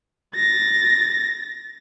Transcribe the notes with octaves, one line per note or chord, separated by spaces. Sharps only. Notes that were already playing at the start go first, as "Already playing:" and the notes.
A6 A#6